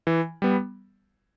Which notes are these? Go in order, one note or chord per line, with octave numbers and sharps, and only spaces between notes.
E3
G3 B3